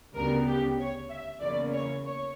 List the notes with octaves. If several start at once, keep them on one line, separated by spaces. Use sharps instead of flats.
D2 C#3 G3 B3 A#4
G4
C#5
E5
E2 C#3 E3 A#3 C#4 D5
C#5
C#5